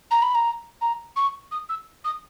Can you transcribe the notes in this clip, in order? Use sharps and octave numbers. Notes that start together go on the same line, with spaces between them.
A#5
B5
A#5
A#5
C#6
D#6
E6
D#6